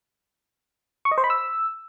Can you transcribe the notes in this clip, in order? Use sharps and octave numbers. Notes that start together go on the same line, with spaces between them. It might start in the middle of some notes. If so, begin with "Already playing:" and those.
C#6
D#5
C5
B5
E6